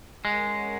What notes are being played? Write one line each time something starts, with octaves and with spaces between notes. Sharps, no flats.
G#3 C#4 A#4 C#5 F#5